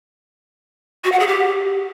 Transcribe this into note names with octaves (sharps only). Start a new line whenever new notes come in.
F#4
F#5
G#4
G4